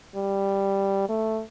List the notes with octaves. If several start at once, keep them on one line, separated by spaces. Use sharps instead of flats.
G3
A3